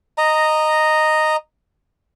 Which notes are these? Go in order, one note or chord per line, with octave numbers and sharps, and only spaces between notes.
D#5 A#5